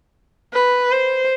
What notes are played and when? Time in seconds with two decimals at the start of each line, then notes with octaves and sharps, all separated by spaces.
0.53 B4
0.92 C5